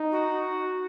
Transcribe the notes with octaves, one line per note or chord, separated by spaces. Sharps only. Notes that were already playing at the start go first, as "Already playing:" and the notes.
Already playing: D#4
F#4